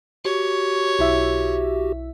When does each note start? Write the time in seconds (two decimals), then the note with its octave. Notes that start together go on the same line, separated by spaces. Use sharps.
0.25 F#4 G4 C#5
0.99 B1 E4 E5